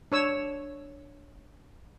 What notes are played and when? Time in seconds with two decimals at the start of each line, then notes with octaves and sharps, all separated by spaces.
0.12 D4 C#5 E6